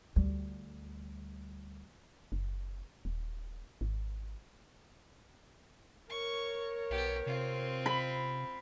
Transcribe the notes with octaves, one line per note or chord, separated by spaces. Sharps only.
D2 G3
F#1
D#1
G#1
A#4 C#5 C#6
B1 B3 G4
C3 C4 F4
B5